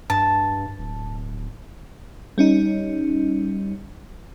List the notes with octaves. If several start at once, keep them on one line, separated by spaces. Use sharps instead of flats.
G2 A5
D1
G3 C#4 D#4